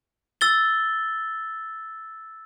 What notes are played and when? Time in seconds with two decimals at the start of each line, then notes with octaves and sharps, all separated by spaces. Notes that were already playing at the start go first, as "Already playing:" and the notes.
0.41 E6 A6 G7